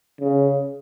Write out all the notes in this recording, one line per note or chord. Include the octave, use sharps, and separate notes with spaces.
C#3